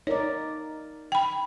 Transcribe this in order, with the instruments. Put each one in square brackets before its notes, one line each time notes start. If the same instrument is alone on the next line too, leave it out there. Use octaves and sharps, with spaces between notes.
[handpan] D#4 A#4 D5 [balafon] C#5
[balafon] G5 B5